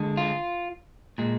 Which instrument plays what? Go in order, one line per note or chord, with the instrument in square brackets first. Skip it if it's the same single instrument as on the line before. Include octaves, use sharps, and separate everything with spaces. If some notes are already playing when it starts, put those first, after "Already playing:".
Already playing: [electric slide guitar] D3 G#3
F4
A#2 G#3